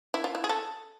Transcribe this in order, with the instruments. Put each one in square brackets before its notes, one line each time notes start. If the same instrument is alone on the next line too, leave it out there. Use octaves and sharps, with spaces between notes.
[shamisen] E4
F4
E4
G#4
A4